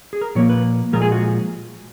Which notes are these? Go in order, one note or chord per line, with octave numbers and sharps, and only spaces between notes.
G#4
A#4
A#2 F3 A#3 C#5
B4
A#2 F3 G#3 A#4
G#4
F#4